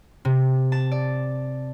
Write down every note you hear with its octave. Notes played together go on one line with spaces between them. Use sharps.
C3
A5
D5